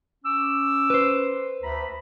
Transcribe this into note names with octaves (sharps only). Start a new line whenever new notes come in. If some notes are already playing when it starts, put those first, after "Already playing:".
C#4 D6 E6
B4 C5
D2 A#5 B5